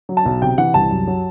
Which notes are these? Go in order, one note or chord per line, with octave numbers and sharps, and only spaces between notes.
F#3
A5
B1
C3 G5
E3 F#5
C2 A5
F#2
F#3